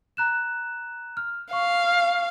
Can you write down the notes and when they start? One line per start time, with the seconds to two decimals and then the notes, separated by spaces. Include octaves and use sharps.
0.17 A#5 F#6 E7
1.17 F6
1.53 F5 C#6